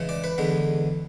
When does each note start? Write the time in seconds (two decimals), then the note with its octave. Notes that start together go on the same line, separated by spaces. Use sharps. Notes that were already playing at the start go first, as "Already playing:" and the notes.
Already playing: C#3 E3 G#3 C#4
0.09 D5
0.24 B4
0.38 E2 D3 G#3